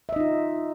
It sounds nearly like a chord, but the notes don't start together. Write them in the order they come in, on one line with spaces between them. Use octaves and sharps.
E5 D#5 D#4 F4